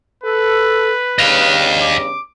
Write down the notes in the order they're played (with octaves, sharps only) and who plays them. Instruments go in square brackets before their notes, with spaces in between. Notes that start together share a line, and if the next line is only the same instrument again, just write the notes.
[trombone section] A4 [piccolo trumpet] B4
[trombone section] E2 G2 C#3 [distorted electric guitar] D#5 F5
[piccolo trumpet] D6